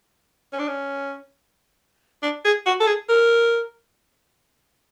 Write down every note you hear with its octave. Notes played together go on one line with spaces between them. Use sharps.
C#4
D4
C#4
D4
G#4
F#4
A4
G#4
A#4